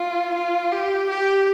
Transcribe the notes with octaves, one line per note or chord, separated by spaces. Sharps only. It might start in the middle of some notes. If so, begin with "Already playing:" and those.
Already playing: F4
F4
G4
G4